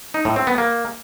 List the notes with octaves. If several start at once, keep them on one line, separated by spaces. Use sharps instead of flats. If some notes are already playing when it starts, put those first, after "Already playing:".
D#4
A2
C4
B3
A#3